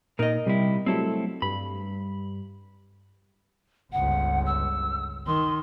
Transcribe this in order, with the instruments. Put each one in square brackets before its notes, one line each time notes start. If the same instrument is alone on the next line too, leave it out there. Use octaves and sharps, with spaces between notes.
[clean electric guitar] A#2 D#4 [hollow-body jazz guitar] A#4 D#5
[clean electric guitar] C3 E4 [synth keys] G3
[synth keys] F#3 G3 A3 [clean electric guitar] C4 E4 A4
[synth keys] G2 [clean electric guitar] B5
[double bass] G1 C#2 [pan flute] F#5
[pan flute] E6
[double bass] D#3 [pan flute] C6